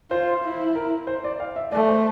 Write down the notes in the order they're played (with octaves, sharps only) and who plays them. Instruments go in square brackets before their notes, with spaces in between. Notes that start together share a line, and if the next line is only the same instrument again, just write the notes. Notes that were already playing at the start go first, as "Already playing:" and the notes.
[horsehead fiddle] F4 [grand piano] C5
[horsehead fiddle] E4
[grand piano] A#4
C5
D5
F5
E5
[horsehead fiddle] A3 [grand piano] D5
[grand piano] C5